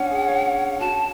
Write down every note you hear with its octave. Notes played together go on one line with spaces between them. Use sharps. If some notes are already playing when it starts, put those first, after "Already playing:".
Already playing: C#4 D4 F#5
G#4
C#5
F#4 A5